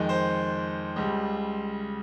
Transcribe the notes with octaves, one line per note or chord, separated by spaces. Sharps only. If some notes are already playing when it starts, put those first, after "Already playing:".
Already playing: F2 D#3 G#3
C5
C#2 C#3 G3